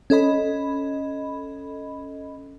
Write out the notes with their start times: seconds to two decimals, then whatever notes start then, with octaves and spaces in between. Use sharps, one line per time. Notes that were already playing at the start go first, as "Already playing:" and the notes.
0.10 C#4 A4 D#5 B5